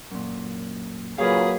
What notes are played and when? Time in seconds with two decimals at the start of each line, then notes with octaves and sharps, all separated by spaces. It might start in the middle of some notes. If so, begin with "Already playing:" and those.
0.11 F#2 A#2
1.18 A#2 C#3 F#3 A#3 G#4 B4 F5